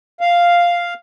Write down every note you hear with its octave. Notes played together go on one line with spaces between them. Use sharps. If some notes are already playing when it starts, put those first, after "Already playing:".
F5